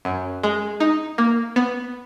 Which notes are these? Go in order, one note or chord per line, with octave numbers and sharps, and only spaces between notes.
F#2
G#3
D#4
A#3
B3